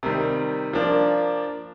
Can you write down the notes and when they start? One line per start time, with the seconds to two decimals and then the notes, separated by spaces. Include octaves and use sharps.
0.03 C3 D#3 G3
0.73 F3 A#3 D4